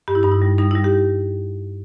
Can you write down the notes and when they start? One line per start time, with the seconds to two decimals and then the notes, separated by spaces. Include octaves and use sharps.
0.08 G2 G4
0.15 E4
0.23 G2 D#4
0.31 E4
0.42 G3
0.58 G3 D#4
0.71 G3 E4
0.84 G4